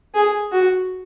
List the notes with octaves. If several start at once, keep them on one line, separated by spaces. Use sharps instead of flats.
G#4
F#4